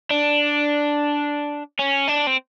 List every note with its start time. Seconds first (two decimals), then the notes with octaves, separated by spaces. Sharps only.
0.10 D4
1.79 C#4
2.07 D4
2.27 C4